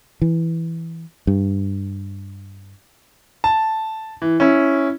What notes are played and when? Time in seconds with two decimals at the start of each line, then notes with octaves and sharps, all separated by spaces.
0.22 E3
1.27 G2
3.44 A5
4.22 E3
4.40 C#4 E4